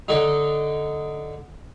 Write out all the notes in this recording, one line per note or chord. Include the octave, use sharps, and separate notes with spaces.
D3 D#4